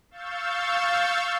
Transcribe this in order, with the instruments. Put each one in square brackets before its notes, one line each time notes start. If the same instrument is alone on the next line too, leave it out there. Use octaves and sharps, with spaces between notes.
[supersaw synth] F5 C#6 E6 G6 A6